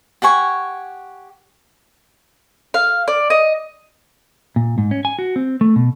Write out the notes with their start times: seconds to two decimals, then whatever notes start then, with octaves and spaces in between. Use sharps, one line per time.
0.22 G4 F#5 G#5 C#6
2.74 F5
3.08 D5
3.30 D#5
4.56 A#2
4.78 G#2
4.91 C#4
5.05 G#5
5.19 F#4
5.36 C4
5.61 A3
5.76 B2